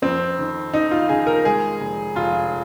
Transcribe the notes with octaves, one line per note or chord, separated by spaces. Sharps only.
F2 C4
D#3
D#3 D#4
F4
D#3 G#4
A#4
G#3 G#4
F1
F1 F4